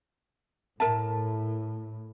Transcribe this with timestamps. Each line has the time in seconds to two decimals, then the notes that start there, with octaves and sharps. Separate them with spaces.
0.80 A2 A#4 E5 A5